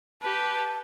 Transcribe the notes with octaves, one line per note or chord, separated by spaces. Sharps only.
G4 B4 A5